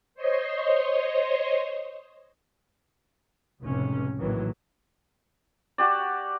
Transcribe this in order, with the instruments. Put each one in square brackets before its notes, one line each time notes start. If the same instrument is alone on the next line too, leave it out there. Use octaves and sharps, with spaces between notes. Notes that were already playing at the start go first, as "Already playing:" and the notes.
[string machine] C5 C#5 D#5 C6
[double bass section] F1 C#2 A2 C3 C#4
A#1 A2 D#3 E3 F#3
[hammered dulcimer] F#4 G4 D5